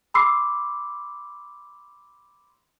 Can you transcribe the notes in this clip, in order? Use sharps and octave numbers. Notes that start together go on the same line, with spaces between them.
B5 C6 D6 E6 C7